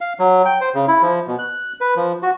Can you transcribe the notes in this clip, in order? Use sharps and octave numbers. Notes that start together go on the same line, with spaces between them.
F5
F#3
G5
C5
C#3
E4
F3
B2
F#6
B4
F3
F#4